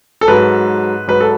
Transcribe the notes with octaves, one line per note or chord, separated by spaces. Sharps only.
A4
G#2 F#3 B4
G#2 F#3 B4
A4